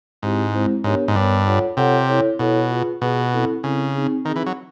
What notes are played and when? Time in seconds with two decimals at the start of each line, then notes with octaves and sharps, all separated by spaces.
0.22 G#2 G#3 C4 E4 G4 C5
0.54 G#3 C4 E4 G4 C5
0.84 G#2 B3 D4 G4 A#4 C#5
1.08 G#2
1.15 G2 B3 D4 G4 A#4 C#5
1.46 F4 A4 C#5 F#5
1.77 C3 F4 A4 C#5 F#5
2.09 E4 A4 C#5
2.39 B2 E4 A4 C#5
2.71 F4 G#4 B4
3.02 B2 F4 G#4 B4
3.33 C4 E4 A4
3.63 C#3 C4 E4 A4
3.95 C4 D#4 G#4
4.25 D#3 C4 D#4 G#4
4.36 E3
4.46 F#3